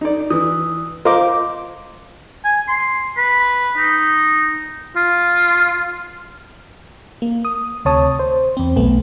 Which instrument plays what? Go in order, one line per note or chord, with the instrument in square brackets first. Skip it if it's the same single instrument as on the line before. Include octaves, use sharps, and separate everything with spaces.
[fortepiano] D#4 D5
[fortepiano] E3 [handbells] D#6
[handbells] F4 F5 D6 [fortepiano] A#4 C5 D#5
[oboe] G#5
C6
B4
D#4
[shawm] F4
[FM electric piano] A#3
D#6
D2 C3 C#5 A5 D#6
C5
E2 C4
B1 A3 B3